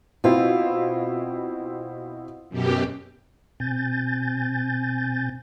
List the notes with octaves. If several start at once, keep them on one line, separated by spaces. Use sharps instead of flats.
B2 C4 E4 F4
F#2 B2 G4
B2 C4 G#5 G6 A6